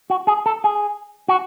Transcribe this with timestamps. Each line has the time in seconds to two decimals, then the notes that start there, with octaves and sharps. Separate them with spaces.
0.10 F#4
0.27 G#4
0.46 A4
0.64 G#4
1.28 F#4